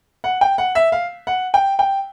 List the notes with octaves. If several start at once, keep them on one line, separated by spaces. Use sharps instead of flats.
F#5
G5
F#5
E5
F5
F#5
G5
G5